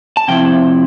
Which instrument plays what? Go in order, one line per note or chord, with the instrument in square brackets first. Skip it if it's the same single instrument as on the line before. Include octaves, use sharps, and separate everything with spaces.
[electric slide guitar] A5
C3 F3 C4 E4 G5